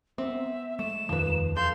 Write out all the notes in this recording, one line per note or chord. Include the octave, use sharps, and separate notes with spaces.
B3 C4 E5
G#3 A3 E7
D#1 F2 D#3 F3 B4
E2 A4 F5 C6 G6